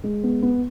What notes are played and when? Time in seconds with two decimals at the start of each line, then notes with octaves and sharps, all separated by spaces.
0.04 G#3
0.23 B3
0.42 B3